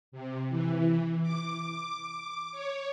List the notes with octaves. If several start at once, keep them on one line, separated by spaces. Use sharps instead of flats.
C3
E3
D6
C#5